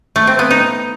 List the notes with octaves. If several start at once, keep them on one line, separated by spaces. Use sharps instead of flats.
A3
C4
B3
D#4